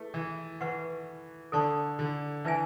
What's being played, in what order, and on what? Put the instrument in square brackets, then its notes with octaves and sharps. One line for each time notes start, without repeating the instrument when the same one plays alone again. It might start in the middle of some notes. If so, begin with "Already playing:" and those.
Already playing: [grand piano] A3 [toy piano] E4 G#4 B4
[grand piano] E3
[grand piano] E3 [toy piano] B4 F#5 C#6
[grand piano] D3 [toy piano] A4 D5 A5 C#6
[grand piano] D3
[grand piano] E3 [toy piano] E4 B4 E5 G#5